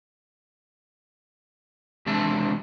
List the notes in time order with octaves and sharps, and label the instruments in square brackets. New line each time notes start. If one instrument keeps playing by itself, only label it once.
[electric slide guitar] E2 C3 G#3 D4 E5 A5